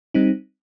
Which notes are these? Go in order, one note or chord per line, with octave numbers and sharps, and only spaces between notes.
G3 C4 D#4